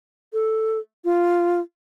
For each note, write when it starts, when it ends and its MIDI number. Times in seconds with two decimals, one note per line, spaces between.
0.33 0.78 69
1.05 1.60 65